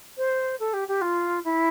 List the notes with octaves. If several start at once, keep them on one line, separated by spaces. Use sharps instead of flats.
C5
A4
G4
G4
F4
E4